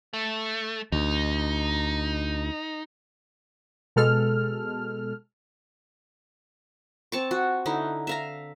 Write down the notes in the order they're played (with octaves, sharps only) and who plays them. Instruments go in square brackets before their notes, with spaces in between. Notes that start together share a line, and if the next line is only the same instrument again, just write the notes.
[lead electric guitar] A3
[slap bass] D2 [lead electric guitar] D#4
[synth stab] B2 G#3 A4 F6
[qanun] C4 A5 C#6
F#4
D3 D#4 E4
E5 F5 A#5